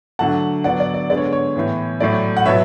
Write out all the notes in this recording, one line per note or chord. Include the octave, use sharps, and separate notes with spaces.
D3 F#3 A3 F#5 A5
D3 F#3 B3 D5 F#5
D5
D5
D3 G#3 B3 D5
C#5
C#5
A2 E3 B3
A2 F#3 A3 D5
F#5
B2 F#3 B3 C#5 E5